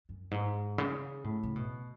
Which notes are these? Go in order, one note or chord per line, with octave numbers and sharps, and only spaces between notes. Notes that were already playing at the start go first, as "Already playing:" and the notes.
F#2
G#2
C#3
A2
C#3
B2